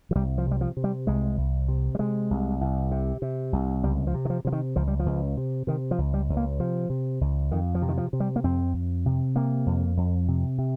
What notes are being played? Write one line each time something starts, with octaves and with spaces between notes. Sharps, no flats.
F3
C2 G3
F3
C3 G3
F3
C3
G3
C2 G#3
C2
C3
G3
C3 G#3
C2
C2
C3
C3
C2
C#2 G3
F3
C3
D#3
F3
C3 F3
D#3
C#2 F3
G3
F3
C#2
C3
C3 D#3
F3
C#2
G3
C#2
A#3
C3 F3
C3
C#2
F2 D#3
F3
C3
D#3
F3
C3
G3
A#3
F2 C4
F2
C3
C3 A#3
F2
F2
C3
C3